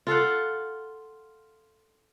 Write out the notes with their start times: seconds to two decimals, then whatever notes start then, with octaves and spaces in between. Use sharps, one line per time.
0.07 F4 A4 F5 F#5